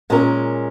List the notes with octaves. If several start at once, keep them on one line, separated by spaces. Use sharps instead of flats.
A#2 G#3 C#4 A#4